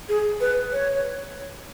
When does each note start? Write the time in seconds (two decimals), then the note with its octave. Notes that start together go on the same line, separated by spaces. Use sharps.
0.09 G#4
0.40 B4
0.72 C#5